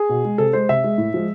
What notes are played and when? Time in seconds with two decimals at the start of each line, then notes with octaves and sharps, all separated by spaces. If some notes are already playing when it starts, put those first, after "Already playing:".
Already playing: G#4
0.09 B2
0.25 G#3
0.38 C3 A4
0.53 G#3 C5
0.69 C3 E5
0.84 G#3
0.98 A2
1.14 F3 G#3